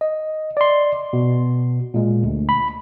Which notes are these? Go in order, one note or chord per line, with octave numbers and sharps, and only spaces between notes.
D#5
D5 C6
B2
A#2 G#3
D2
B5